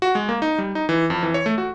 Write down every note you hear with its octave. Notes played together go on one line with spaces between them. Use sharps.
F#4
G#3
A#3
D#4
G3
D#4
E3
F2
E3
C#5
A3
F#4